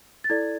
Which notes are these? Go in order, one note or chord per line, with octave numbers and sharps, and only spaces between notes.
A6
E4 A4 D5 G#6